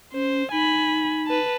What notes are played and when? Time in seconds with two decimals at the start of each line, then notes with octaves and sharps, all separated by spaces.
0.13 C#4 C5
0.52 D#4 G#5 B5
1.27 B4 A5